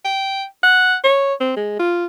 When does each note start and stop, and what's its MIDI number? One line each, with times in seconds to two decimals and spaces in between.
0.05 0.45 79
0.63 0.96 78
1.04 1.34 73
1.40 1.53 60
1.57 1.75 56
1.79 2.06 65